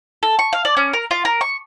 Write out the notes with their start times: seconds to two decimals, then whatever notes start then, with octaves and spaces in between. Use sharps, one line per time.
0.23 A4
0.39 C#6
0.53 F5
0.65 D5
0.77 C#4
0.93 A#4
1.11 F4
1.25 A#4
1.41 C#6